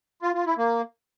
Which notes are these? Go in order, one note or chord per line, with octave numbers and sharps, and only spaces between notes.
F4
F4
E4
A#3